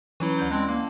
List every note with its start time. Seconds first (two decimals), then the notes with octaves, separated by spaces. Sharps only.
0.20 E3 F#3 C#4 E4 B4
0.38 D2 D5 G6
0.50 G#3 C4 E4 A5 C6 F#6
0.69 A#3